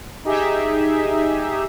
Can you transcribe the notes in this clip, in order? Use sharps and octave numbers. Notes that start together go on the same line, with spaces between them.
D#4 G4 G#4 E5